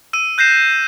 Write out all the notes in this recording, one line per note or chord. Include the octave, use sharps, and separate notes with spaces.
E6 D#7
F#6 G6 A#6 C7 E7